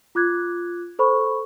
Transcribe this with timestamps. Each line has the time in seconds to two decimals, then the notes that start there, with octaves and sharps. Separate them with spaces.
0.15 F4 D6 F#6 G#6
0.99 A4 C5 B5 C#6